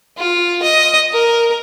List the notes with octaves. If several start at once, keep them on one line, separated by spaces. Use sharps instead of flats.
F4
D#5
A#4